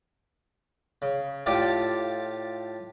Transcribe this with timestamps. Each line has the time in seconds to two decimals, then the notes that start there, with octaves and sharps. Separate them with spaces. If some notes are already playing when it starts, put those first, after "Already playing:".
1.02 C#3
1.46 A2 F4 G4 A4 D5 D6